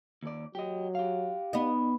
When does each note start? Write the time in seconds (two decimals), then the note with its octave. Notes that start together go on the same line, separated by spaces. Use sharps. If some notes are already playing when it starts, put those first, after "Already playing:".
0.23 D#2 D5
0.55 F#3 G4 D#5
0.95 G4 F5
1.53 B3 D#4 D#5